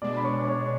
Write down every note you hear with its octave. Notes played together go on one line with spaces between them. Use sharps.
B2 G#3 D4 D5 D6
B5
C#5 C#6
D6
C#5 C#6